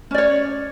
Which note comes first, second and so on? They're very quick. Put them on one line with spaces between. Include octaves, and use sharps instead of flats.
C#4 D5 C#5